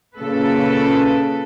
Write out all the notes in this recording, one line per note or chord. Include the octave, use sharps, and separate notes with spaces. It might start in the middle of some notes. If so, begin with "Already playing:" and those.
A#2 C#3 A4 B4